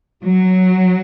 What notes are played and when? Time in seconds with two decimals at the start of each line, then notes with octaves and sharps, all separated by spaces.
0.24 F#3